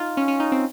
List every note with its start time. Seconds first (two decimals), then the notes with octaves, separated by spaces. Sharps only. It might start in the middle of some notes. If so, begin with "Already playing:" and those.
Already playing: D#4 F4
0.17 C#4
0.28 C#4
0.40 D#4
0.52 C4